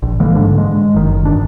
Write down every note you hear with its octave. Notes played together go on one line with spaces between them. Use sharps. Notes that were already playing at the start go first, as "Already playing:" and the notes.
A#1
D3 E3 G#3 A#3
D2 G#2 D3 D4
G#3
F#1 D#3
G#1 D4